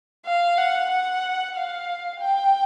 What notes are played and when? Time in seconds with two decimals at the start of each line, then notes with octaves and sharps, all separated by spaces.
0.25 F5
0.57 F#5
0.90 F#5
1.55 F5
2.20 G5